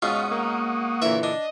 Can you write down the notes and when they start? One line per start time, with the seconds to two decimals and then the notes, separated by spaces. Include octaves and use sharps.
0.02 G#2 B2 C#4 F4 F#5 C#6 D#6
0.31 A#3
1.02 A#2 D3 E3 C#5 E5 B5
1.23 D4 D#5